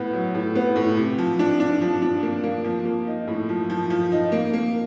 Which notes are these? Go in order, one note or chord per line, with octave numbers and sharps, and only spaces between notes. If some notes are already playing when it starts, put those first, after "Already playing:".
Already playing: A2 B3
F#3
A2
B3
A2
C3
F3
D4
D4
F3
D4
A#3
A#3
F3
A#3
D#4
A2
F3
F3
F3
D#4
A#3
A#3